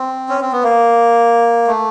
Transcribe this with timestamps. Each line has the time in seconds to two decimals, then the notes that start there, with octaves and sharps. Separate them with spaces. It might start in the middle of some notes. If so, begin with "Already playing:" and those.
Already playing: C4
0.29 C#4
0.41 C4
0.52 B3
0.63 A#3
1.67 A3